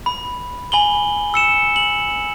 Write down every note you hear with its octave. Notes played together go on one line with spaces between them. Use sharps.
B5
G#5 B5 F#7 G7
E6 C#7 E7
F#7